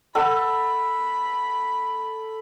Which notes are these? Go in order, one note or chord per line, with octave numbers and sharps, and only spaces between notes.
A4 F#5 B5 E6